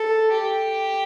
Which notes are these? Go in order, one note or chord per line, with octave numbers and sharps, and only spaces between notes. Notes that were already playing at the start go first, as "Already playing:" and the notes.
Already playing: A4
G4